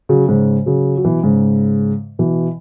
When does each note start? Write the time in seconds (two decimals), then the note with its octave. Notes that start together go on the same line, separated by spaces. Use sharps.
0.09 C#3 F#3
0.29 G#2 C#3
0.66 C#3 F#3
0.97 F#3
1.04 B2 E3
1.23 G#2 C#3
2.19 B2 E3